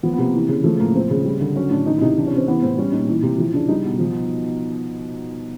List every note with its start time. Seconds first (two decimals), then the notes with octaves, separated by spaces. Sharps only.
0.03 F3 B3
0.13 B3
0.18 C3 A#3
0.33 E3
0.49 C#3
0.64 F3 A3
0.80 A2 A#3
0.94 F3 C4
1.10 C#3
1.25 G3
1.41 D3
1.56 F#3 C#4
1.71 A2 D4
1.86 D#3 D#4
1.97 E4
2.01 C3 D#4
2.17 E3 D4
2.27 C#4
2.32 C3 C4
2.47 E3 B3
2.62 A2 C4
2.78 G3 C#4
2.92 A#2 D#4
3.08 E3 D#4
3.23 C3
3.38 F3 E4
3.54 C#3 D4
3.68 G3 D#4
3.85 B2
3.99 F3